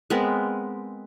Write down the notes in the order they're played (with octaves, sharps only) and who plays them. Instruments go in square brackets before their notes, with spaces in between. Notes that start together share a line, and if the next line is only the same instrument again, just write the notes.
[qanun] G#3 B3 C4 A#4